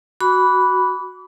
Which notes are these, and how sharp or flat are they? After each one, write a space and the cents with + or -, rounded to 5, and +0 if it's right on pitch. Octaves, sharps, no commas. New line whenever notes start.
F#4 +0 B5 +0 D6 -40